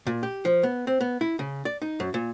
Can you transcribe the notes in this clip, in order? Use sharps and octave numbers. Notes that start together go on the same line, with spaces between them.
A#2
G4
F3
B3
C4
B3
E4
C#3
D5
D#4
F#2
A#2